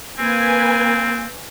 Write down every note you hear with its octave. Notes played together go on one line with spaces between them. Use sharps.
A#3 C4 B4 G#5